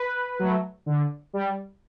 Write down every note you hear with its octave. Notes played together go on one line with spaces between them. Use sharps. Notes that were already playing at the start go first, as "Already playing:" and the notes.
Already playing: B4
F#3 A3
D3
G3